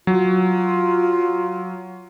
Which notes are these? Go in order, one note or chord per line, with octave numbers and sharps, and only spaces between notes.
F#3 F4